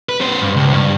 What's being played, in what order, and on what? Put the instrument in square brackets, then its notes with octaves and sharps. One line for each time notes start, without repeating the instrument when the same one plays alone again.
[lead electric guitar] B4
B3 C5
G2
C#2
G2